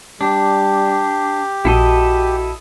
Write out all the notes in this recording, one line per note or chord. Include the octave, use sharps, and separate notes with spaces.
G3 D4 G4
A#1 E4 F#4 A4 D#5